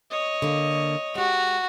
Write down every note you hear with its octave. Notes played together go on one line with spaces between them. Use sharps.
C#5 D#5
D3 A#3
G#3 F#4 G4